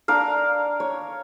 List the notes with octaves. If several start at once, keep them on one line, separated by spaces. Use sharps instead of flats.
D4 A#4 F5
C#5